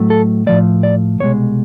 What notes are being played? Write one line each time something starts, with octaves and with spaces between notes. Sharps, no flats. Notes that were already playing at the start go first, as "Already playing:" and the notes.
Already playing: A2 F#3 A3
A4
A2 F3 A3 D5
D5
C2 B2 G#3 C#5